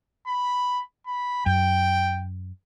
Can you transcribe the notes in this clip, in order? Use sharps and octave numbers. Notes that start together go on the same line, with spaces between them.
B5
B5
F#2 G5